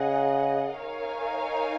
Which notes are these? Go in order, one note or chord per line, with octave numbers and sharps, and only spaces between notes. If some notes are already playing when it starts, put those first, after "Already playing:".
Already playing: C#3 G#4 D#5 F#5
D#4 A#4 C#5 F5 G#5